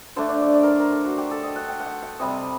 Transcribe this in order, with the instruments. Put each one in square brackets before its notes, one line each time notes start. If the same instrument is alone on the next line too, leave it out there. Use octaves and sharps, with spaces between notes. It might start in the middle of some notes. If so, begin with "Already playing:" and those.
[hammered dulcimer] D3 A3 D4 C5
D5
D5
D5
A#4 C5
A#4
A4
F#4
G4
A4
D#5
F#5
G5
F#5
G5
F#5
C3 G3 C4 D#5